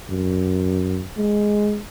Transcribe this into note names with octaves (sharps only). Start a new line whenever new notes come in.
F#2
G#3